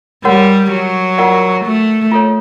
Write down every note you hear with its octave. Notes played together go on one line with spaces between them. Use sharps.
G3 F#4 A#4 C#5 F#5
F#3
F4 A#4 D5 F#5
A3
F4 A4 C#5